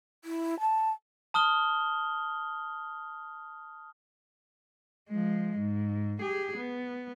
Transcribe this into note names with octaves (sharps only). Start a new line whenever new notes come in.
E4
A5
A5 D#6 F6 G7
F3 G#3
G#2
G4 G#4
B3